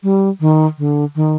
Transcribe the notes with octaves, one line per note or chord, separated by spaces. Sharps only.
G3
D#3
D3
D#3